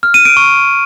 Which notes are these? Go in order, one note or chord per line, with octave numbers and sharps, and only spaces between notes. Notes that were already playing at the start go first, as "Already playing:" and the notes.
F6
D#7
D7
C#6